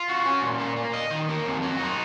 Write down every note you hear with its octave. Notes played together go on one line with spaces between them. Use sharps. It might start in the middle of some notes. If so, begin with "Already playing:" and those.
Already playing: F4
F#4
C#4
A#2
A#3
A#3
D#5
D#3
A#3
F2
F#3
D#4